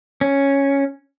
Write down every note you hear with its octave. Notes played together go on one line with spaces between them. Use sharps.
C#4